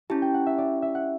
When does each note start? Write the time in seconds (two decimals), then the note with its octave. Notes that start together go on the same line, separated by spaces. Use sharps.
0.10 C#4 E4 G4 A5
0.22 G5
0.34 F#5
0.46 E5
0.58 D5
0.82 E5
0.95 F#5